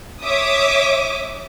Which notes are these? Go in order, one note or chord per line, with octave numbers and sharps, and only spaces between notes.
C#5 E5 D6 D#6